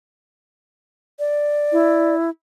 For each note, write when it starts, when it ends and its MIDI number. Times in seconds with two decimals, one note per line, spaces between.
1.19 2.15 74
1.72 2.30 64